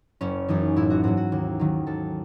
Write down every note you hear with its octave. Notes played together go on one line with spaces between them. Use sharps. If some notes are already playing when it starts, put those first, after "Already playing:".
F#1 C#4
F#2 E3 D#4
A1 E4
F#4
G#2 F#3 F#4
F#4
D#2
D#3 F#3
D#2 A4